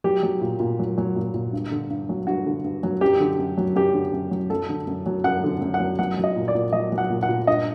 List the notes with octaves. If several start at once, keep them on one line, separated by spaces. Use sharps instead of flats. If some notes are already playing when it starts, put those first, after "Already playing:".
F#3 G4
F#3
A#2
A#2
F#3
F#3
A#2
A#2
G2
D3
G2
F#3
G2 F#4
D3
G2
F#3
F#2 G4
D3
F#2
F#3
F#2 G4
D3
F#2
F#3
F#2 A4
D3
F#2
F#3
F#2 F#5
D3
F#2
F#5
F#3
F#3 F#5
F#3
D#5
A#2
D5
A#2
F#3 D#5
F#3
F#5
A#2
F#5
A#2
G2 D#5